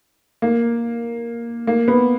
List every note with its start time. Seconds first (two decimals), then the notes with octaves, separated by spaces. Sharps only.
0.42 A#3
1.67 A#3
1.88 B3